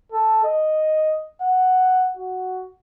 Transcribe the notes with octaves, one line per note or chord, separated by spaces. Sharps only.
A4
D#5
F#5
F#4